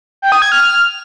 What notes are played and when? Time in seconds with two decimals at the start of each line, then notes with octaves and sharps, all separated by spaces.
0.22 G5
0.32 D#6
0.42 G#6
0.52 F6